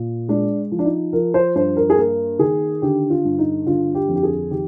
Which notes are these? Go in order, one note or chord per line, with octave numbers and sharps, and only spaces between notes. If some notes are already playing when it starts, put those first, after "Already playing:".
Already playing: A#2
G#3 D4
F3
D4
D#4
F3 A#4
C5
G2 C5
A#4
G#4
A#3 A#4
D#3 G#4
D3 G4
F4
G2
D#4
D3 F4
G4
F2
G4
G#4
D#3 G4